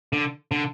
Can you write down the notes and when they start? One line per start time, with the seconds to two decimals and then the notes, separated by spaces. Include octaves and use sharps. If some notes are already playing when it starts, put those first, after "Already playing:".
0.13 D3
0.51 D3